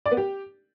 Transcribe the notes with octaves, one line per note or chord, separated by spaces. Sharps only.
D5
B3
G4